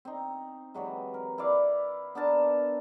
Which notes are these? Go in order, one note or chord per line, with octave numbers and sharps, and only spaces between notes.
C4 D#4
C3 E3 F#3 G#3
A#4
E4 B4 D5 F5
B3 D4 A#4 A5